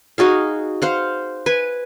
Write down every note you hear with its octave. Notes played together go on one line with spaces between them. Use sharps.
D#4 F#4 G#4 F5
C5 F5 F#5
B4 G#5